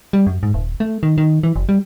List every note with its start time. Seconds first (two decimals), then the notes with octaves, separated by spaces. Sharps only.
0.13 G3
0.27 F#2
0.43 G#2
0.54 D#1
0.80 A3
1.03 D#3
1.18 D#3
1.43 E3
1.56 F#1
1.69 G3